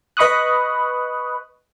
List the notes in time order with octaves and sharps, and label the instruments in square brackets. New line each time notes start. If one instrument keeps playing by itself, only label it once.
[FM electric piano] B4 D#5 B5 C#6 D#6 F#6